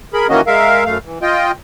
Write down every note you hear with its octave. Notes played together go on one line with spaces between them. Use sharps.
G#4 A#4 B5
D#3 E3 A#3 C#4 F#4 D#5
G#3 A#4 E5 F5
F#2 A3 F5
E3
F4 D#5 G5